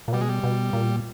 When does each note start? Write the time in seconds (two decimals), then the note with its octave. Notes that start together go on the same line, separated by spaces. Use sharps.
0.08 A#2
0.13 B2 G3
0.21 G#3
0.29 G3
0.43 B2
0.73 A#2